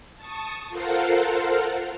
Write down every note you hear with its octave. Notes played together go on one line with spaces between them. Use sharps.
A5 C#6 D#6
F4 A4 A#4 C5 F5 F#5